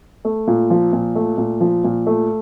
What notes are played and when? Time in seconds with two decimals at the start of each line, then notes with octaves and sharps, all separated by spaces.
0.25 A3
0.47 A#2
0.70 F3
0.93 A#2
1.15 A3
1.38 A#2
1.60 F3
1.84 A#2
2.07 A3